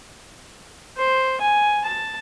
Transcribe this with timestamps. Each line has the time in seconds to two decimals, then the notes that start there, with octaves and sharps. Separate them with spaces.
0.97 C5
1.41 G#5
1.85 A5